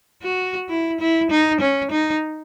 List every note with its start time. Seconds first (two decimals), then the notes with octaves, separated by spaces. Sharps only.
0.23 F#4
0.69 E4
1.00 E4
1.31 D#4
1.60 C#4
1.91 D#4